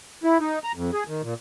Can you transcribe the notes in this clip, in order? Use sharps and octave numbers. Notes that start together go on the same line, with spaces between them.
E4
D#4
A#5
F2
G#4
D#3
A#2